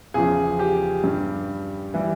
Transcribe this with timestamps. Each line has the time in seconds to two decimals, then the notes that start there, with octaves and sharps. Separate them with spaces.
0.14 E2 C#3 F3 G#4
0.59 G4
1.03 G2 G3
1.94 E3 G3